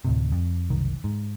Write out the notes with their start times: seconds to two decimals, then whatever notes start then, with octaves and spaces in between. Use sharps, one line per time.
0.05 D2 A2 C3
0.32 F2
0.70 F#1 C2 D#3
1.04 G#2